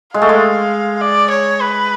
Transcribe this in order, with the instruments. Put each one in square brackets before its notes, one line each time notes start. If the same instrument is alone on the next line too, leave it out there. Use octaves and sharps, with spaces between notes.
[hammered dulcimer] G#3 [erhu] F5
[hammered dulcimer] A3
G#3
[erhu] D5
C#5
B4